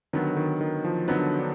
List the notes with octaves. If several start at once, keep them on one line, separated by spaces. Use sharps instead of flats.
D3 D#3 F#3 B3
D#3
D#3
F3
D3 F#3 B3 D#4
D4